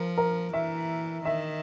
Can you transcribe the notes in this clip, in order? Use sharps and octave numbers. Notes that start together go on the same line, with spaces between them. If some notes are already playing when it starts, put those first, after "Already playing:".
Already playing: F3 A#4
A#4
E3 E5
D#3 E5